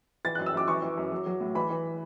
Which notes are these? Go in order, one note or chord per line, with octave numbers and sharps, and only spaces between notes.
E3 A6
F#6
F#2
E6
F#2 D6
E3 C#6
E3
F#2
F#3
F#3
A2
E3 B5
E3